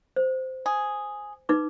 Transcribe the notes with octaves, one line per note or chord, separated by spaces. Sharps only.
C5
G#4
D#4 B4 D6